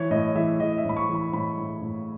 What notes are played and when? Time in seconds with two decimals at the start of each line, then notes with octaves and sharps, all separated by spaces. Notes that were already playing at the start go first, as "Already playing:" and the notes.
Already playing: E3 C#5
0.11 A2 D#5
0.35 E3 E5
0.60 E3 D#5
0.78 E5
0.85 A2 B5
0.97 C#6
1.09 E3
1.15 B5
1.33 A2 B5
1.58 A2
1.82 A2